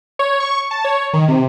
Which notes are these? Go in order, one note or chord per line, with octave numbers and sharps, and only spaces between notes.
C#5
C#6
A5
C#5
D#3
C3